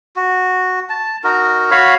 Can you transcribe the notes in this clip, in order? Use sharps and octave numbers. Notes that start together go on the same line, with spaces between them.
F#4
A5
D#4 F#4 A#4
F#4 C#5 F5 B5